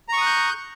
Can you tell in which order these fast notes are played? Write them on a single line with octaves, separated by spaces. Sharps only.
A#5 C#6 D#6 F#6 G6